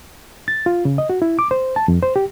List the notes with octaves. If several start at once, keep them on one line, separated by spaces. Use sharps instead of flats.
A6
F4
C#3
D#5
F#4
E4
D6
C5
A5
F2
C5
G4